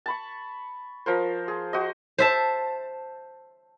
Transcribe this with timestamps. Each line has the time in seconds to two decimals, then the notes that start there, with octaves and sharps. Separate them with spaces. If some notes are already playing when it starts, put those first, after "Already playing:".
0.06 A5 B5 C#6
1.06 F3 A#4 C5
1.48 G#4
1.73 F#4 C5 D#5
2.18 C5 E5 A5